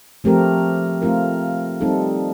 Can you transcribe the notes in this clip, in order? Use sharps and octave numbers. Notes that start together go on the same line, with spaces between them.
F3 A3 C4 G4 A#4
A3 C4 F4 A#4
G3 C4 D#4 A4